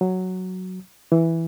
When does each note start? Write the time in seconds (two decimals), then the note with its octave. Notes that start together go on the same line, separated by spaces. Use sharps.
0.01 F#3
1.12 E3